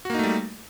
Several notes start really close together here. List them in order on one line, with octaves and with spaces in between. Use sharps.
F#4 A#3 D#4 A3 G3